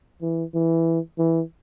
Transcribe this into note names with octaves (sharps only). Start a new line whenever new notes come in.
E3
E3
E3